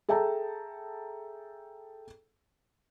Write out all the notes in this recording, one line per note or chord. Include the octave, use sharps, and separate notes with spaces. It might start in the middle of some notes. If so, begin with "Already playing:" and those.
G#4 A4 E5 G5 A5 A#5